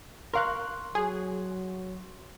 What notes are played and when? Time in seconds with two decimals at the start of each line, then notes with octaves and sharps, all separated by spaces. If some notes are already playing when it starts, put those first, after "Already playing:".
0.33 A#4 F5 C6 C#6 F#6
0.95 F#3 G#4